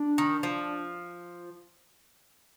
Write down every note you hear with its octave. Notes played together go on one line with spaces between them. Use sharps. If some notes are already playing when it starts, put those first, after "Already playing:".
Already playing: D4
D#3
F3